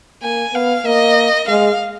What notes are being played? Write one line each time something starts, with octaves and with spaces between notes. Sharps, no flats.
A#3 G#5
B3 F5
A#3 D#5
G#3 F5